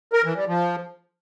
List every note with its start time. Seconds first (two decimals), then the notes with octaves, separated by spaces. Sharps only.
0.13 A#4
0.24 E3
0.36 G3
0.47 F3